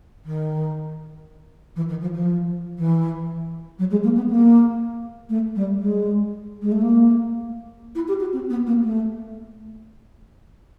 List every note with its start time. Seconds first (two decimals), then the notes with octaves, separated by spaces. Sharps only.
0.25 D#3
1.76 E3
1.88 D#3
2.01 F3
2.14 F3
2.78 E3
3.78 F#3
3.90 G#3
4.03 A#3
4.15 B3
4.29 A#3
5.29 A3
5.55 G3
5.80 G#3
6.61 G#3
6.71 A3
6.81 A#3
7.95 E4
8.08 G4
8.20 F#4
8.33 C4
8.49 B3
8.66 A#3
8.83 A3